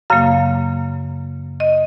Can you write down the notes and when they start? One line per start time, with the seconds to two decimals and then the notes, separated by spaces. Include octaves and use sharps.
0.10 F#2 C#3 F#3 A#3 F5
1.60 D#5